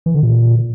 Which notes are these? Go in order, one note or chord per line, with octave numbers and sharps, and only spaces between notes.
E3
D3
A#2